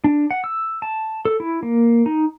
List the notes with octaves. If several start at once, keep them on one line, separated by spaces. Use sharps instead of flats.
D4
F#5
E6
A5
A4
E4
A#3
D#4